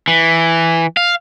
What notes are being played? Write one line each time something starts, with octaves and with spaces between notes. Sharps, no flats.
E3
F5